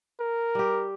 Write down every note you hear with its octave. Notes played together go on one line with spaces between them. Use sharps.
A#4
G3 G4